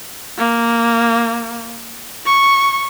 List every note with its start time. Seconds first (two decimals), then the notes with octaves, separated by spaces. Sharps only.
0.39 A#3
2.26 C#6